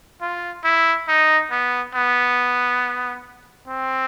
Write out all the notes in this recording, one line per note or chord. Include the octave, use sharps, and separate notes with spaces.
F4
E4
D#4
B3
B3
C4